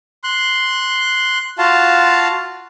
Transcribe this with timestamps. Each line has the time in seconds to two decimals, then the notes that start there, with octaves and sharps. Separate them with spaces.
0.24 C6 F#6
1.58 F4 F#4 F5 A5